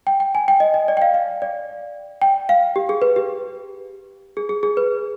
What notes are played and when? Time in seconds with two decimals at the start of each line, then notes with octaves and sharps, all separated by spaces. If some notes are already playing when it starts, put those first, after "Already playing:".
0.07 G5
0.20 G5
0.35 G#5
0.48 G5
0.60 D#5
0.74 D#5
0.88 D5
0.97 G5
1.02 F5
1.14 F5
1.42 D5
2.22 G5
2.49 F5
2.76 G4
2.89 G#4
3.02 B4
3.16 G4
4.37 G#4
4.49 G#4
4.63 G#4
4.77 B4